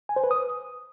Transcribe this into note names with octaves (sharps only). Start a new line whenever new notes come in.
G#5
C5
B4
D#6